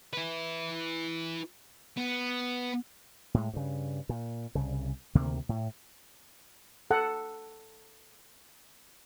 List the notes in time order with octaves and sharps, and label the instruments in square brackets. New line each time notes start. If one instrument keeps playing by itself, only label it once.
[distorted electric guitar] E4 B4
B3
[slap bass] A2 G#3
G2 C#3
A#2
C2 C#3
D2 C3 D#3 A#3
A2
[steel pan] A4 F#5